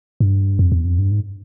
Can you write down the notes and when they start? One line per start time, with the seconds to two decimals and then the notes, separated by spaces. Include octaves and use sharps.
0.20 G2
0.59 F2
0.72 E2
0.85 F2
0.98 G2
1.11 G#2